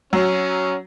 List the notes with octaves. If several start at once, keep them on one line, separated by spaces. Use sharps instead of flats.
F#3 C#4